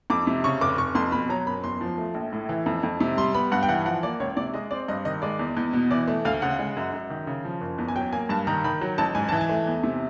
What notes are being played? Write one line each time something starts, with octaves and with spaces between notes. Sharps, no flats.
F2 D6
C3
C#3 C#6
F1 D6
F1 C#6
F2 C6
B2 B5
F#3 A#5
F#1 B5
E2 C6
F3
A3
A#1
A2
E3
F2
F2
C3
G3 C6
B3 B5
G2 F#5
G5
E3 F#5
F3 F#5
A#3 D5
C#2 C#5
C3 D5
G#3 D#5
C4 D5
G2 D#5
D#3 D#5
G#3 D5
E2
E2
B2
E3 D5
A3
D2 F5
C#3 F#5
G#3
F#2
F#2
D#3
C#3
F3
F#1
E2
G#5
F#3 G5
A#3 G#5
G2 A5
D#3 A#5
D#3 B5
F#3
A1 A5
G#2 G#5
E3 A5
G#5
A3
E2
C3